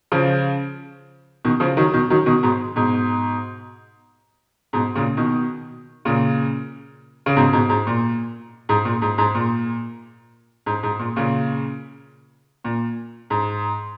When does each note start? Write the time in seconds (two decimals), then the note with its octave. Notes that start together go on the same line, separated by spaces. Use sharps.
0.12 C#3 F3
1.45 B2 D#3
1.60 C#3 F3
1.77 D#3 F#3
1.94 B2 D#3
2.10 D#3 F#3
2.26 B2 D#3
2.43 G#2 B2
2.76 G#2 B2
4.73 G#2 B2
4.95 A#2 C#3
5.17 B2 D#3
6.05 A#2 C#3
7.26 C#3
7.37 G#2 B2
7.53 G#2 B2
7.69 G#2
7.87 A#2
8.69 G#2
8.85 A#2
9.02 G#2
9.18 G#2
9.35 A#2
10.66 G#2
10.83 G#2
10.99 A#2
11.16 A#2 C#3
12.64 A#2
13.30 G#2